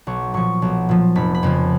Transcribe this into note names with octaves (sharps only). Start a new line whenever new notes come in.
B1 C#6
A#2 F3 C#6
B1
A#2 F3
F1 B5
B5
F2 C#3 F3